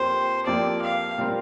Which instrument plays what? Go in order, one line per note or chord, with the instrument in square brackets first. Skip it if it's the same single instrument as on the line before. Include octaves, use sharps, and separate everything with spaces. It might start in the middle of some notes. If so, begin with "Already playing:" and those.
Already playing: [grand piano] F2 F3 A#3 G4 [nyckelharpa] C5
[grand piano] F2 F3 A#3 G4 [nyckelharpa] D5
[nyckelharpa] F5
[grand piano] A#2 G3 C4 A#4